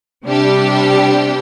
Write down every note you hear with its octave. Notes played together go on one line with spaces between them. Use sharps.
C3 G3 D4 G4